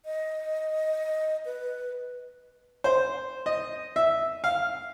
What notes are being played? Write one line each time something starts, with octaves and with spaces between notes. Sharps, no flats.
D#5
B4
C5
D#5
E5
F5